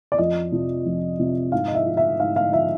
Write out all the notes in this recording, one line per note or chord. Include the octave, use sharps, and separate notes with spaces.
D5
F2 D#5
C3 F3
F2
C3 F3
G#2 F5
D#5
E5
F3
E5
G#2 F5
F5
F3 E5